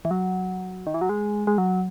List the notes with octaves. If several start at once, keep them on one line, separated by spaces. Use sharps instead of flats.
E3
F#3
D#3
E3
F#3
G#3
G#3
F#3